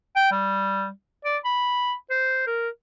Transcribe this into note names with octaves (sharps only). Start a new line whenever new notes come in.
G5
G3
D5
B5
C5
A#4